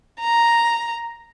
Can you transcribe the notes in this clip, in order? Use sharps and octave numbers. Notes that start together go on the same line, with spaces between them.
A#5